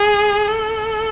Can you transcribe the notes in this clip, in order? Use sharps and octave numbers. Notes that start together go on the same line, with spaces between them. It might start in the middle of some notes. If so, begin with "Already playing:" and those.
Already playing: G#4
A4